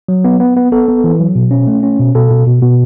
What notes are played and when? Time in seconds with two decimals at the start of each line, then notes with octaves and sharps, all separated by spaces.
0.08 F#3
0.25 B3
0.40 B3
0.57 B3
0.72 B3 A4
0.88 B3
1.04 E3
1.19 F#3
1.35 B2
1.51 C#4
1.67 A3
1.83 C#4
1.99 B2
2.15 B2 A4
2.31 B2
2.47 B2
2.62 B2